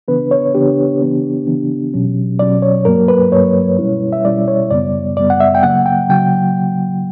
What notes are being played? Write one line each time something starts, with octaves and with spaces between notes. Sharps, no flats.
C#3 E3 B3 D4 B4
C#5
C#3 E3 B3 D4 G4
C#3 E3 B3 D4
C#3 E3 B3 D4
B2 F#3 C#4
B2 F#3 C#4 D5
C#5
G2 F#3 A#3 A#4
B4
G2 F#3 A#3 C#5
B2 G3 C#4 E4
E5
B2 G3 C#4 E4 D5
C#5
F#2 C#3 G3 B3 D5
F#2 C#3 G3 B3 D5
F#5
E5
G5
C#3 F#3 A#3 F#5
G5
C#3 F#3 G5